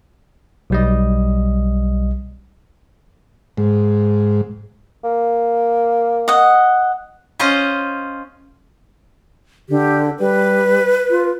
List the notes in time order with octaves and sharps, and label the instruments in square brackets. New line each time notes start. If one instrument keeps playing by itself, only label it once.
[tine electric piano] B1 G3 D#5
[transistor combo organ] G#2
[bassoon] A#3
[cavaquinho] D#5 F#5
[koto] C#4 F4 C5 D#5
[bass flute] D3 [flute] G4
[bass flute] G3 [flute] B4
[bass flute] F4